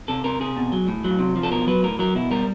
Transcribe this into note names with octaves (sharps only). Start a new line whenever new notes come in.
C3 A4
C3 A#4
C3 G#4
B2
F#3
A2
F#3
C3
F3
A4
B2 A#4
F#3 B4
A2 A#4
F#3 A#4
B2 E4
G3 A#4